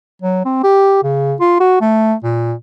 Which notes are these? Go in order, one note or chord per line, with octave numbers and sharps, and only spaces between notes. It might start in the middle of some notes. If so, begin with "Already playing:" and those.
F#3
C4
G4
C#3
F4
F#4
A3
A#2